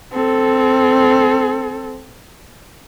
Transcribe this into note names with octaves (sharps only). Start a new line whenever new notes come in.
C4 A4